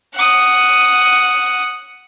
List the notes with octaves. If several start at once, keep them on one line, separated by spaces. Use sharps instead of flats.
F#5 D#6